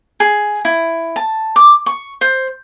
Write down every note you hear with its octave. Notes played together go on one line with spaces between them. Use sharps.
G#4
E4
A5
D6
C#6
C5